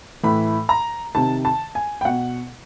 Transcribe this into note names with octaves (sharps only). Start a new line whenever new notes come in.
A2 E3 B5
A#5
C3 D#3 A5
A5
G#5
G5
B2 F#5